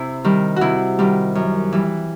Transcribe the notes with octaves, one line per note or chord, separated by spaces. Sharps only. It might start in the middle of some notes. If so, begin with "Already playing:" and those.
Already playing: C3 E4
D#3 G3
C3 E4 F#4
D#3 G3
F#2
E3 G3